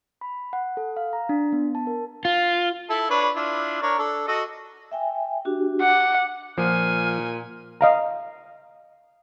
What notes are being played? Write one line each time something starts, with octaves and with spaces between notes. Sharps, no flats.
B5
F#5
A4
F5
A#5
D4
B3
A5
A#4
F4
E4 A4
D4 B4 C#5
D4 E4 F4
D4 A#4 C#5
D4 A4
F#4 A4 D#5
E5 G5 G#5
D4 F#4 G4
F#5 D6
A#2 F3 G#5 F6
D#5 F5 A#5